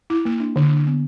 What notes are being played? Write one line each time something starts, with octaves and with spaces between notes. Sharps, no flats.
E4
A#3
D4
D3
D4
B3